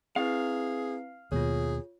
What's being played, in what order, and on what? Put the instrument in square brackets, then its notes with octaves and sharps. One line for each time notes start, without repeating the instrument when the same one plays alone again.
[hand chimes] C4 E4 B4 [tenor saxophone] G#4 [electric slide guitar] F5
[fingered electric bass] D#2 B2 [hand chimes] F4 C#5 [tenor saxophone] G#4